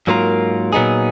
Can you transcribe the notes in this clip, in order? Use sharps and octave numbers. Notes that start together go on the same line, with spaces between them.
G#2 F#3 A#3 F4 A#4
A#2 F#3 B3 D#4 G#4